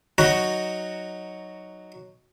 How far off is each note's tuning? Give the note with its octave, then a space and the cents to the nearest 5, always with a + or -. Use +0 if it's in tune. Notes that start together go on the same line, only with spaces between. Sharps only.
F#3 +0 D#4 +0 F#4 +0